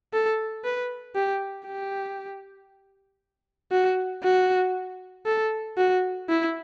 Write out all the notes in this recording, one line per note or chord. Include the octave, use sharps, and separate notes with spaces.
A4
B4
G4
G4
F#4
F#4
A4
F#4
E4